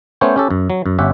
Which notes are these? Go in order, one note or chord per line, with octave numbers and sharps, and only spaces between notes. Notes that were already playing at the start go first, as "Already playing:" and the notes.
A3 B3 C#4 C5 C#5 G5
C#4 G4 A4
F#2
F#3
F#2
G1 C#4 G4 E5 F#5